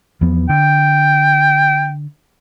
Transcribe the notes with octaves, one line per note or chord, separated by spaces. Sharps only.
E2 F3 B3
D3 G5